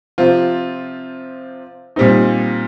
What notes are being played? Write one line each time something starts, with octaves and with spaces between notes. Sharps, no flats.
C3 F3 C4 F4
A#2 G3 C4 D#4